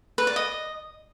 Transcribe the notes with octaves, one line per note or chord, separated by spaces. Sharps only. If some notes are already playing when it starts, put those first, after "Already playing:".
B4
D5
D#5